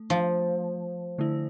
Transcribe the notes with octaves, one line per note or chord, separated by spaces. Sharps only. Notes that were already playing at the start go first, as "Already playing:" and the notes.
Already playing: A3
F3
D3 A3 E4